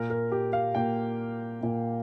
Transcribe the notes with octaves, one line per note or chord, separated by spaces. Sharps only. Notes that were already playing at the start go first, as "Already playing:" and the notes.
Already playing: A#2 A#3 A#4
A#4
G4
F5
A#2 A#3 G5
A#2 A#3